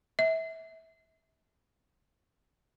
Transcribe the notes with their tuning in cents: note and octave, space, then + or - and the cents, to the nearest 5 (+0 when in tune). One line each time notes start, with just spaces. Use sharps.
E5 -25